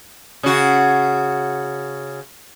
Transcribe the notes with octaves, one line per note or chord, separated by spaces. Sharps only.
C#3 F#4